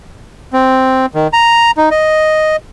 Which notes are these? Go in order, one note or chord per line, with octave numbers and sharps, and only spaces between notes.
C4
D#3
A#5
D#4
D#5